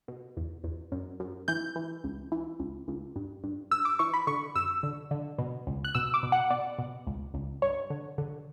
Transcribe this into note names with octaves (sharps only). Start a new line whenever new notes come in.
B2
E2
E2
F#2
F#2
E3 G6
E3
C#2
E3
C#2
C#2
G2
G2
G2 E6
D6
E3 C#6
B5
D3 C#6
F#2 E6
D3
D3
B2
C#2
F#6
B2 E6
D6
B2
F#5
B2 D5
B2
C#2
C#2
G2 C#5
D3
D3